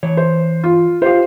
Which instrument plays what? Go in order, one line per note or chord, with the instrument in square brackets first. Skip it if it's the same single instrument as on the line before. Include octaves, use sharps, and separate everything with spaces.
[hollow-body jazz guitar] E3 C#5
[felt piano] C5
F4
[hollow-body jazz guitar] F4 F5 [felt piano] G4 C5